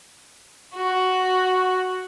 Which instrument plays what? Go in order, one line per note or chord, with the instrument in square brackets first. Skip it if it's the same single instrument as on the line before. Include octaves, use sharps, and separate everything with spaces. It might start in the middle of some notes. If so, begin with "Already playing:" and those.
[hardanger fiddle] F#4